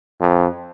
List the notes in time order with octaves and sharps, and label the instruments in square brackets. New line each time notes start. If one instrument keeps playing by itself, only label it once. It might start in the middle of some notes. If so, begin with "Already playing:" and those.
[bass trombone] F2